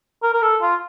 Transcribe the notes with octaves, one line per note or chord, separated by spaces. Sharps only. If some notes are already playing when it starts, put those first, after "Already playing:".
A#4
A#4
A4
F4